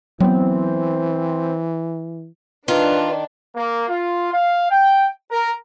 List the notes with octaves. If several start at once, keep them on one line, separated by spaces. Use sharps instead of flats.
E3 F#3 B3 C4
D#3 D4 F4 B4
A#3
F4
F5
G5
A#4